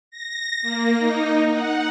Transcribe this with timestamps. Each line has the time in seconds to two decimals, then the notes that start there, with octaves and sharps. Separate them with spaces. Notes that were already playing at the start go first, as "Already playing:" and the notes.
0.11 A#6
0.62 A#3
0.99 D#4
1.50 F#5